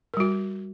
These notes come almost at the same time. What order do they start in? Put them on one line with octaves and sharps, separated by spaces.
A#4 G3 F#4